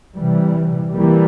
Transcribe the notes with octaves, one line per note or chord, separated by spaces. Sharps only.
C3 E3 G3
E3 G3 A#3